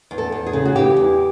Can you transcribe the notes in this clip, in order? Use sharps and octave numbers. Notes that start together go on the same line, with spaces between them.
E2
A4
E2
G#4
C#3
F#4
E3 G4
E2